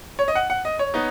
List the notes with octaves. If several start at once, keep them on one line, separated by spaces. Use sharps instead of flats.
C#5
D#5
F#5
F#5
D#5
C#5
B3 D#4